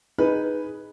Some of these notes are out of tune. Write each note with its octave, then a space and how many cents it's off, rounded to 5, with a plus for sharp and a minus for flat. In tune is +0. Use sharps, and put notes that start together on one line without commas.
D#4 +0 G#4 +0 B4 +0